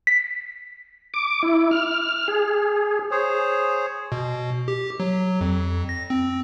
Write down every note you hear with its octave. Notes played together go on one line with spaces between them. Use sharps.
B6
D6
E4
F6
G#4
G#4 C5 C#5
B2
G4
F#3
F2
A#6
C4